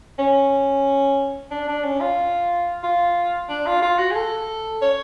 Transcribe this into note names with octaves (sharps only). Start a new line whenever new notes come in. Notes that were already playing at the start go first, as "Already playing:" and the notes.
C#4
D4
D4
C#4
F4
F4
D4
F4
F4
F#4
G#4
A4
C#5